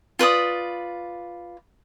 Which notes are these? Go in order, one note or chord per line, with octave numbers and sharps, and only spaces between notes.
F4 B4 D5 D#6